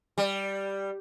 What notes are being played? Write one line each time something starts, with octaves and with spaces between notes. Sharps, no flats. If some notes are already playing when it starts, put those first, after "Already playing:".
G3